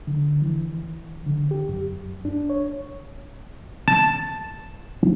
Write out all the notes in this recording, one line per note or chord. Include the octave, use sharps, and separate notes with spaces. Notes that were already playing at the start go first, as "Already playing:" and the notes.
D3
E3
D3
G4
F#2
D4
C#5
A5